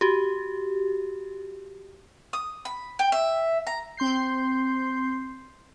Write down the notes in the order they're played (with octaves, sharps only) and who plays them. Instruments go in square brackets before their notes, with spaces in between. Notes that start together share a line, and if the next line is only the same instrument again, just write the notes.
[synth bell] F#4 G4
[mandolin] D#6
B5
G5
E5
A#5
[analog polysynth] C4 C6 G6 C7